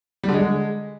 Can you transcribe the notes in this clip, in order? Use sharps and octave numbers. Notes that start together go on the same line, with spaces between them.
G3
D3
G#3